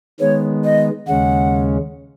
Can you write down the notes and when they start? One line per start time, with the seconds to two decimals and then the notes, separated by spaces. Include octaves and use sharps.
0.20 D#3 G#3 B3 C#5
0.64 D#5
1.07 D#2 C#3 G#3 C#4 F#5